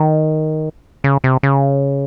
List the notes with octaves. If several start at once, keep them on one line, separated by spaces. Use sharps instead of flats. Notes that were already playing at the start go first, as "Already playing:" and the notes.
Already playing: D#3
C#3
C3
C#3